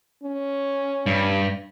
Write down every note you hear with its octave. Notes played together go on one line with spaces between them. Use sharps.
C#4
G2